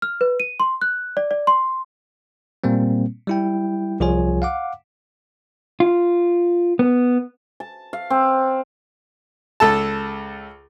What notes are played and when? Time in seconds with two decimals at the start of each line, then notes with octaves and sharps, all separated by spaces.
0.02 F6
0.21 B4
0.40 D#7
0.60 C6
0.82 F#6
1.17 D5
1.31 D5
1.47 C6
2.64 A#2 G3 A#3 C4
3.27 G3 E4 G5
4.00 C2 F3 F4 G#4 C#5 G#5
4.42 F5 F#5 D6
5.80 F4
6.79 B3
7.60 A5
7.93 F5
8.10 C4
9.60 C#2 A4 A5